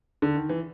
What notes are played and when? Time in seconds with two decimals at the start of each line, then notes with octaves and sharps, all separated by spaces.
0.22 D3
0.36 D#3
0.49 E3